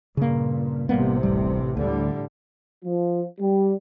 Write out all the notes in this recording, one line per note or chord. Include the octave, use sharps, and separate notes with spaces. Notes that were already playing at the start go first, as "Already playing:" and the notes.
G2 A#2 C#3 A#3
A1 C3 G3 A#3 B3
D1 G3
D2 A2 D3 G3
F3
G3